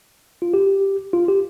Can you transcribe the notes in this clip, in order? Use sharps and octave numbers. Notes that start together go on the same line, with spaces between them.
F4
G4
F4
G4